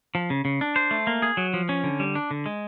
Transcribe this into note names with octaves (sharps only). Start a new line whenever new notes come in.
F3
C#3
C#3
D4
C5
A3
A#3
G#4
F#3
F3
C#4
D3
G3
D4
D3
G#3